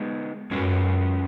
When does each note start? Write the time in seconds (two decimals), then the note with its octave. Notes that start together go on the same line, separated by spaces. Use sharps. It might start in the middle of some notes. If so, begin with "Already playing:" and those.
Already playing: G#3 B3 D#4
0.51 F#2 G#3 C#4 B4